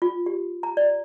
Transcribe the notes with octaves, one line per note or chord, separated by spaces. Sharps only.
F4
G4
A#5
D5